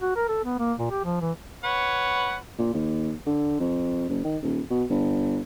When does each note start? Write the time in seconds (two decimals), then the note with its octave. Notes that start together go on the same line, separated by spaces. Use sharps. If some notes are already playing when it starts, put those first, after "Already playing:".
0.01 F#4
0.16 A#4
0.28 A4
0.45 B3
0.59 A#3
0.79 A#2
0.90 G4
1.04 F3
1.21 E3
1.64 B4 C#5 F#5
2.58 A#2
2.74 D#2
3.26 D3
3.60 F2
4.09 F#1
4.24 D#3
4.43 D#1
4.70 B2
4.89 G1